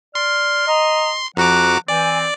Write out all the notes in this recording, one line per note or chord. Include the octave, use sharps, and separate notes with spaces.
D5 C6 F6
D#5 A#5
F2 F3 F#4 F#5 A#5 D6
E3 C4 D5 G#5